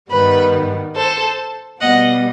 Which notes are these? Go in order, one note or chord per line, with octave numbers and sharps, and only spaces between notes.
G2 D#3 G3 B3 B4
A4 C5
B2 G3 B3 D#5 F#5